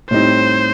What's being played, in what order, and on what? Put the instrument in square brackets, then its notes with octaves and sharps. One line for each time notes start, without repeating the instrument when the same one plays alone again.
[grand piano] A2 G3 C4 D#4 [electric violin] C5